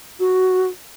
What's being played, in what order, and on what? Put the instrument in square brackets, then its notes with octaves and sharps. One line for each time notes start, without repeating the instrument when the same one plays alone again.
[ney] F#4